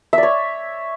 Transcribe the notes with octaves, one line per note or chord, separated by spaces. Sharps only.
E5
D5
C#5